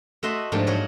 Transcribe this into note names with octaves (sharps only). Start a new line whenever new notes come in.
A3 F#4 D#5 E5 C6
G#2 F3 A3 A#3 D4 G4
F#3 D#4 F#4 A#4 C#5